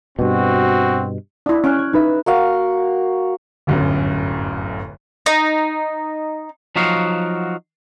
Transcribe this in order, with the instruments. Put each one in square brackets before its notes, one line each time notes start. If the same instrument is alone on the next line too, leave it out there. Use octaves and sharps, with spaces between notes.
[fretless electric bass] G2 B2 [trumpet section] C4 F#4
[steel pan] D4 E4
[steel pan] C#4 [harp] F6 F#6 D7
[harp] G#6
D#4 B4 E5
[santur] A#3 F#4 F5
[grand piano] D1 G1 F#2
[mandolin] D#4
[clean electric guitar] F3 F#3 D#4 F#4 F5